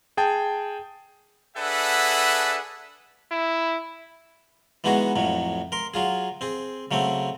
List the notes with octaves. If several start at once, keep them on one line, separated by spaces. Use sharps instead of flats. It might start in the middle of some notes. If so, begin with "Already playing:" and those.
G#4 G5 A5
D4 G#4 A4 B4 E5 F#5
E4
E3 G#3 B3 D#4 F#4 G#4
F2 A2 F#3
A#4 C6
F#3 F4 G#4
C4 G#4
C#3 F#3 A3 C4